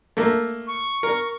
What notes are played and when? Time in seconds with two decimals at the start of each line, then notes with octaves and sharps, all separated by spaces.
0.17 A3 A#3
0.67 C#6
1.03 A#4